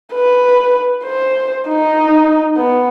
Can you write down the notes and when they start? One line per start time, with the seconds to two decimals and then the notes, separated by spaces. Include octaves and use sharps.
0.14 B4
1.05 C5
1.69 D#4
2.57 B3